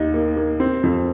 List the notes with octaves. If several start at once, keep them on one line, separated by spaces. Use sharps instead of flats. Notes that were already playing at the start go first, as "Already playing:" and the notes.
Already playing: D#2 D#4 D#5
A#3
A#3
C4
F2